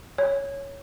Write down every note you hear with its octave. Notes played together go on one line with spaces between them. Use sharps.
C#5